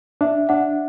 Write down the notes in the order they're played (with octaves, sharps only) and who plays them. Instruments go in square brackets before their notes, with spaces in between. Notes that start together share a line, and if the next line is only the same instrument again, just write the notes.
[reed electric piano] D4 [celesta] E5
[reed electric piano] D4 [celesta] F#5